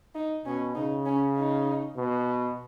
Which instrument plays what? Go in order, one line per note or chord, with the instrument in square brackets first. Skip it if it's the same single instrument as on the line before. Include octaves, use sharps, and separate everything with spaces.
[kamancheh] D#4
[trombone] B2 [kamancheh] C#4
[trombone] C#3 [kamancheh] D#4
[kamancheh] C#4
D#4
[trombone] B2